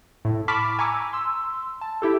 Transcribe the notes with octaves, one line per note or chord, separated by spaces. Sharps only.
A2
A5 B5 C#6 D6 F6 B6
G#5 A#5 C#6 D6 E6
C6 E6
A5
E4 G4 A4